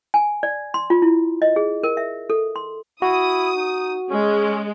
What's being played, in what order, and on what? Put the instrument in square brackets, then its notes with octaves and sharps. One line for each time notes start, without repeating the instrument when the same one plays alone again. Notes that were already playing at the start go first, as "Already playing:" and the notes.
[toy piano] G#5
D5
C6
F4
E4
D#5
G#4
A#4
E5
A4
C6
[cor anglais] E4 [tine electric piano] F#4 [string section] D#6
[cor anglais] D#4
[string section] G#3 [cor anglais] C#4